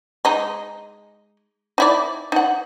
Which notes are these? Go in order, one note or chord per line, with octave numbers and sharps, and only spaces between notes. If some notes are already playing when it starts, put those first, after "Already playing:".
G#3 D#4
D#4 E4 D5
D#4 F#5